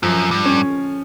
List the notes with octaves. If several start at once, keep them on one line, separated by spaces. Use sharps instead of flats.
F#2 F3
G2
C#4